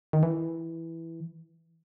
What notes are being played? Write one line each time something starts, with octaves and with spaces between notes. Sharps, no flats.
D#3
E3